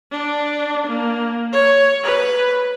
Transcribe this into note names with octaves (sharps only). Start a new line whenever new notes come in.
D4
A#3
C#5
B4